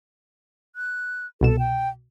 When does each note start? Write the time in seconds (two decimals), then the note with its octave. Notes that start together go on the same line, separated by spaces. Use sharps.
0.76 F#6
1.41 C2 B2 A4 E7
1.59 G5